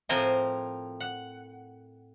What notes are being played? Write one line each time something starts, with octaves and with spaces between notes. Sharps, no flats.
A2 F3 C4 A#4 C5 G#5
F#5